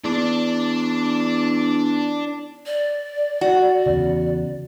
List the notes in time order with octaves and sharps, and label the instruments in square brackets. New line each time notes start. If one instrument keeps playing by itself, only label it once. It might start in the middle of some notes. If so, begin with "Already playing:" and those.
[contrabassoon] E2 [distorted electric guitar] D4 D5
[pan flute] D5
[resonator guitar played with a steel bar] F#4
[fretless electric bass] E2 C#3